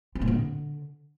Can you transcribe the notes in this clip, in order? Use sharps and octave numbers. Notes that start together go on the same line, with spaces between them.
C4
A#2
D3